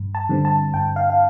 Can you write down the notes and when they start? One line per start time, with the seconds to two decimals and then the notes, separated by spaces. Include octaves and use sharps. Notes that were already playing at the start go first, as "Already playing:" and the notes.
Already playing: G2
0.15 A5
0.29 D3 G3 C4
0.45 A5
0.74 G2 G5
0.96 F5
1.10 F5